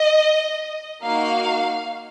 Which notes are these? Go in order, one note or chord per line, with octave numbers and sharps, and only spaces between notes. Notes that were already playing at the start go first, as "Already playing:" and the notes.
Already playing: D#5
A#3 D#4 F#4 F5